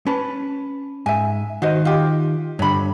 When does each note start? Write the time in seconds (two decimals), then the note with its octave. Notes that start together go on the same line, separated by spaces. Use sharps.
0.07 C#4 B4 A5
1.06 G#2 E5 G#5
1.62 D#3 F#4 C5 D#5
1.85 F4 G4
2.59 G2 D3 C#5 B5